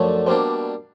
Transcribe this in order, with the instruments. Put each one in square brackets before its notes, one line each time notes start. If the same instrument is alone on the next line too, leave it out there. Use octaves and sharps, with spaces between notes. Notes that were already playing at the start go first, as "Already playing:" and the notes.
Already playing: [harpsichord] F#2 D3 F3 A3 [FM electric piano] A4 C#5 D5
[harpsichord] B2 G3 A#3 D4 [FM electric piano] C5